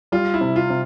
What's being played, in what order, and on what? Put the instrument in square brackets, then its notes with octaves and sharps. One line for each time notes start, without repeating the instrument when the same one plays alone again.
[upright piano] G3 [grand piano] F4
[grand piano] E4
[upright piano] C3
[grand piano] F4
[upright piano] C3